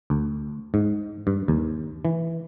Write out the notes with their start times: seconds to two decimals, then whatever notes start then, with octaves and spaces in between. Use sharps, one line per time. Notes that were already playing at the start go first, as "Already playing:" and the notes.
0.10 D2
0.74 G#2
1.27 G2
1.48 D#2
2.05 E3